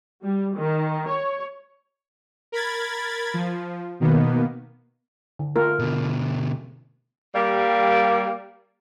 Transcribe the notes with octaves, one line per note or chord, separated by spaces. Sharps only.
G3
D#3
C#5
A#4 B5 G#6 A6
F3
B2 D#3 A#3 B3
D3
A3 F4 A#4
B2 D3
G3 A#3